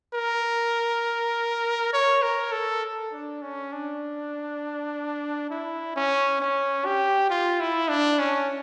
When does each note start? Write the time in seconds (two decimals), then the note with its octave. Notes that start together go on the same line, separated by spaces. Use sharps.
0.14 A#4
1.93 C#5
2.22 A#4
2.52 A4
3.12 D4
3.42 C#4
3.72 D4
5.50 E4
5.96 C#4
6.41 C#4
6.86 G4
7.30 F4
7.60 E4
7.89 D4
8.19 C#4